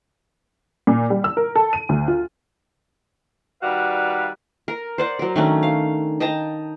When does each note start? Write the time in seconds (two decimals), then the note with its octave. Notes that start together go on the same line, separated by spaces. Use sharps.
0.87 A#2
1.10 G3
1.24 E6
1.37 A#4
1.56 A4
1.73 D#7
1.89 D2
2.08 F4
3.63 D#3 G3 F#4 B4 D5 F5
4.68 A#4
4.98 C5 D5 F#5
5.19 F#3 A#4
5.36 D#3 A3 C#4 D4
5.63 F5
6.20 D#5 G5 A5 A#5